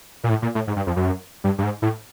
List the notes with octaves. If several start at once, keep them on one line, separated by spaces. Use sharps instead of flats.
A#2
A2
A#2
A2
G#2
G2
F2
F#2
G2
G2
G#2
A2